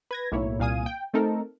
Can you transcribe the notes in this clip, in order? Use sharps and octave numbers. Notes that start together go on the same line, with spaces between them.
B4 G#6 A#6
B1 A2 A#3 E4 C#5
C2 A#2 F5 G#5 D#6 D#7
G5
A3 C4 D#4 A4 A#4